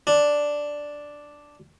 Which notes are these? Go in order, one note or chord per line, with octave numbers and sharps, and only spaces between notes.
D4